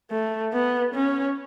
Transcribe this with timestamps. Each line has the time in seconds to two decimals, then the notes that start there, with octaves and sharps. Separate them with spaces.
0.11 A3
0.53 B3
0.94 C#4